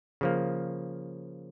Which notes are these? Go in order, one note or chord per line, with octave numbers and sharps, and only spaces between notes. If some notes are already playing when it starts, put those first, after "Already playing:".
C#3 F3 A#3